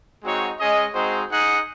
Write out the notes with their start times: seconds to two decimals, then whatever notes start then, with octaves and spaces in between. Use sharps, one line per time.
0.23 G#3 C4 D#4 F#4 C#5
0.59 G#3 C#4 G#4 D#5
0.94 G#3 C4 D#4 F#4 C5
1.31 D#4 G#4 D#5 F#5